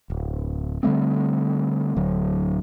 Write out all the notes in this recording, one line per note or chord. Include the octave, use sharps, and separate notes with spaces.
D1
D3 G3 A3 C4
D1 D3 F#3